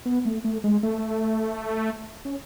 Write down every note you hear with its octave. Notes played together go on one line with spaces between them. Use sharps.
B3
A3
A3
G#3
A3
C#4